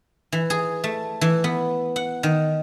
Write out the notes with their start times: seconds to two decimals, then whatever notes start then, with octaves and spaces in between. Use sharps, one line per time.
0.32 E3
0.50 G#4
0.84 A3
1.21 E3
1.44 B3
1.96 F#5
2.23 D#3